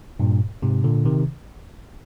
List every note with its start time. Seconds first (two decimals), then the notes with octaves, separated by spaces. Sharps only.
0.20 G2 A#2
0.62 G#2 C3
0.84 A#2 D3
1.05 C3 D#3